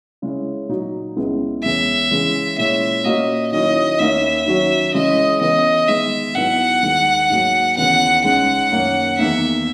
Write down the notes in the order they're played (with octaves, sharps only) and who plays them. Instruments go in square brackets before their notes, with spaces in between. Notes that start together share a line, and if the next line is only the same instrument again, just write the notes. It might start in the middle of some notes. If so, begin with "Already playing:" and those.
[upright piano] C#3 G#3 C#4 E4
A#2 F#3 A#3 D#4 F#4
C#2 C#3 G#3 B3 E4
[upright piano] E2 C#3 G#3 C#4 [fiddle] E5
[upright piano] C#3 E3 G#3
[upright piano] A#2 G#3 C#4 E4 [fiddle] E5
[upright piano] A#2 A#3 C#4 F#4 [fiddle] D#5
[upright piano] D#3 F#3 C#4 E4 [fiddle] D#5
[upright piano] D#2 D#3 A#3 C#4 [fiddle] E5
[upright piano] D#3 F#3 C#4 F#4
[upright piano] C#3 E3 G#3 C#4 E4 [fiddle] D#5
[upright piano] C#3 E3 B3 E4 [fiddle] D#5
[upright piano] D#3 G#3 B3 [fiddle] E5
[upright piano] G#2 F#3 B3 E4 [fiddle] F#5
[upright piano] D#2 D#3 G#3
G#2 F#3 A#3
[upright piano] D#2 C#3 E3 B3 D#4 [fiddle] F#5
[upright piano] C#2 C#3 G#3 D#4 [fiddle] F#5
[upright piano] F#2 D#3 A#3 C#4
[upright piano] E2 D#3 A#3 [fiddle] E5